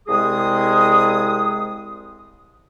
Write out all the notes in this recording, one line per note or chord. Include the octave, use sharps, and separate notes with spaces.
C2 G#3 G#4 D#6